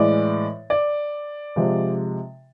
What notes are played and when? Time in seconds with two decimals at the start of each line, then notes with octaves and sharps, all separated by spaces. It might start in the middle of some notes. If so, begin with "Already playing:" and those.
Already playing: A2 E3 G#3 D5
0.70 D5
1.56 C3 F3 G#3